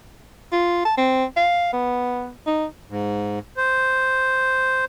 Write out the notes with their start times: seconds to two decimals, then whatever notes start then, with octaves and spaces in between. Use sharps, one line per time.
0.52 F4
0.85 A5
0.97 C4
1.37 F5
1.73 B3
2.47 D#4
2.89 G#2
3.57 C5